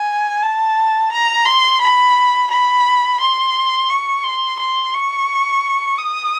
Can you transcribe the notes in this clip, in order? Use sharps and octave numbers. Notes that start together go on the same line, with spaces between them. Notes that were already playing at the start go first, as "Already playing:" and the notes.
Already playing: G#5
A5
A#5
C6
B5
B5
C6
C#6
C6
C6
C#6
D#6